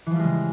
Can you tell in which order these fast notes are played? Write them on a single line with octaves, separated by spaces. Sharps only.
E3 F3 G3 G#3 C#3